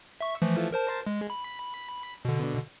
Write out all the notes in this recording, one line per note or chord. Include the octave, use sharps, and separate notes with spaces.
E5 C#6
E3 F3 A3
A#4 C5 A5
G#3
B5
B2 D3